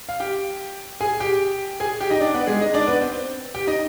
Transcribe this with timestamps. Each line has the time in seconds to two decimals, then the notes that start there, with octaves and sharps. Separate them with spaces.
0.09 F5
0.20 G4 G5
1.01 G#4 G#5
1.20 G4 G5
1.80 G#4 G#5
2.01 G4 G5
2.10 D#4 D#5
2.20 D4 D5
2.34 B3 B4
2.47 G#3 G#4
2.61 D#4 D#5
2.74 D4 D5
2.87 B3 B4
3.01 C4 C5
3.54 G4 G5
3.67 D#4 D#5